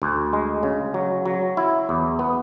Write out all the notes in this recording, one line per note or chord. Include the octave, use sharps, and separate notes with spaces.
D2
G#3
C#3
F#3
F#3
E4
E2
B3